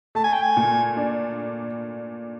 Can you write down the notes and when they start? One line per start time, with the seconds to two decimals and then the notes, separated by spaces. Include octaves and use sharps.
0.15 A3 A5
0.24 G#5
0.33 G5
0.42 G#5
0.57 A#2
0.97 D4